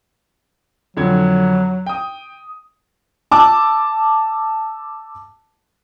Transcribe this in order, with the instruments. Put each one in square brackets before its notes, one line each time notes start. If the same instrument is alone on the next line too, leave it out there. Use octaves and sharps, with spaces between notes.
[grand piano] F2 D3 G#6 [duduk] F#3
[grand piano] G5 D#6
[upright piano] A5 D6 E6